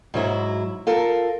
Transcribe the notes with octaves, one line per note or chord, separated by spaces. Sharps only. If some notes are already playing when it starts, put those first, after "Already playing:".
G#2 F#3 E4
F4 A4 A#4